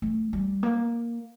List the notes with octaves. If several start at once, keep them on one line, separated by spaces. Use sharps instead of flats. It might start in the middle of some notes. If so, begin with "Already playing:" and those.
A3
G3
A#3